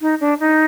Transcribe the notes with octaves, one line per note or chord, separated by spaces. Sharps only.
D#4
D4
D#4